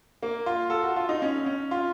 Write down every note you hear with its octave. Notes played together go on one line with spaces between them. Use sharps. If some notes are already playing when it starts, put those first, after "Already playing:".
A#3
F4
A4
F#4
F4
D#4
C#4
C#4
F4